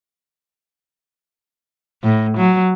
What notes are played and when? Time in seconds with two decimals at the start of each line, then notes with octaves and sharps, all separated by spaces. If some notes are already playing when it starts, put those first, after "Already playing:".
2.03 A2
2.37 F#3